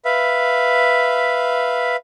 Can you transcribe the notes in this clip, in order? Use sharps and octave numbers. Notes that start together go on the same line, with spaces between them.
B4 E5 F5